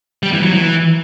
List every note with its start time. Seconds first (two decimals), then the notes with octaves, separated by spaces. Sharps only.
0.23 G3
0.33 E3
0.43 F#3
0.53 E3